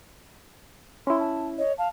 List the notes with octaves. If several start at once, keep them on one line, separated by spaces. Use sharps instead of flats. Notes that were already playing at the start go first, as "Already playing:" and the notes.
C#4 E4 C6
A5
C#5 D#5
F5 A5